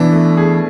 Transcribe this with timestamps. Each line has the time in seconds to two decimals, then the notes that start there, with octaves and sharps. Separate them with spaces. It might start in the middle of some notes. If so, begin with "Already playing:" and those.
Already playing: B2 E3 D4
0.12 A3
0.37 G#4